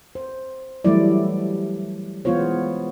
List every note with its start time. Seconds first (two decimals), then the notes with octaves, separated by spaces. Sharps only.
0.15 C5
0.85 E3 F#3 G3 A3 E4 D5
2.25 E3 G#3 B3 F4 C5 C#5